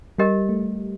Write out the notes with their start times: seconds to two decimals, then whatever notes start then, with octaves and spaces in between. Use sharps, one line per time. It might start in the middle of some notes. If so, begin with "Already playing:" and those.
0.18 G3 G4 A#4 D#5
0.49 A3